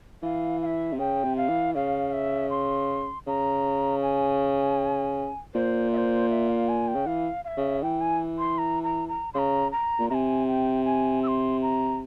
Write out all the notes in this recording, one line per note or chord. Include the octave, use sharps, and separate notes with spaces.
E3 F5
F5
E5
C3
C#3 G5
C3
F5
E3
C#3 F5
E5
C6
C#3 A#5
G#5
A#2 C5
E5
C5
E5
F5
G#5
G5
C#3
E3 F5
F5
E5
C#3
E3 G5
G#5
C6
A#5
A#5
A#5
C#3 A#5 C6
A#5
A#2
C3 G#5 A#5
G5
G#5
E6
C6
A#5